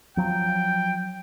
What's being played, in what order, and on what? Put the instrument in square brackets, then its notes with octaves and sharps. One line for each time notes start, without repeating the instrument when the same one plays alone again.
[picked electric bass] F3 F#3 [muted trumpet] G5